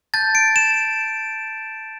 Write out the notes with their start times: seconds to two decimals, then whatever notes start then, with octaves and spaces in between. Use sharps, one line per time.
0.14 A5 G6 A6
0.35 D7
0.56 E7